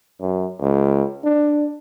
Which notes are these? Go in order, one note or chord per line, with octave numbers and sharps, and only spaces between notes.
F#2
C#2
D4